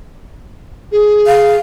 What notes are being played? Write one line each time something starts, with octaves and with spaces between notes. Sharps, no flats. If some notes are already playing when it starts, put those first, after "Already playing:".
G#4
F5